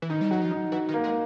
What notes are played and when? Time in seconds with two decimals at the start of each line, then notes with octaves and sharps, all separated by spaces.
0.02 E3
0.10 D#3 D#4
0.21 G3
0.31 F#3 F#4
0.42 F3
0.51 D#4
0.72 E3 F#4
0.89 D#3
0.94 A#3
1.04 G#3